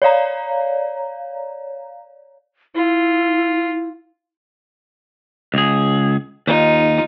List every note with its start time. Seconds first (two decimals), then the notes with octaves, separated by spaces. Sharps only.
0.02 C#5 D5 F5 A#5
2.75 E4 F4
5.54 C#2 G#4
6.47 D#2 D#4 F4